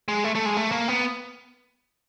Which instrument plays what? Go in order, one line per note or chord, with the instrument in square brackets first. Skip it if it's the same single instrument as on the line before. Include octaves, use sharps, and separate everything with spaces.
[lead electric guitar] G#3
A3
A3
G#3
A3
A#3
B3